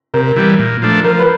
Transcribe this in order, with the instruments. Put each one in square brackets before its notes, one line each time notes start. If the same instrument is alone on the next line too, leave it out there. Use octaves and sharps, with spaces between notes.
[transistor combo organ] C3 [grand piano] A#4
[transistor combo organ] E3 G3
A#2
F3 A3 D4
[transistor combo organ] F3 [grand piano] A#4
[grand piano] B4